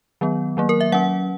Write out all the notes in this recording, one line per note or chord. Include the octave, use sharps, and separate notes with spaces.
D#3 F#3 B3
D#3 F#3 A#3
A#4
E5
F#3 C#4 F#5